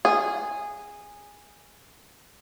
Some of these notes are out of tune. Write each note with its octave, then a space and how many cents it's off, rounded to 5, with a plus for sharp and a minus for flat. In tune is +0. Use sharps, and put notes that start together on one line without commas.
G#4 -10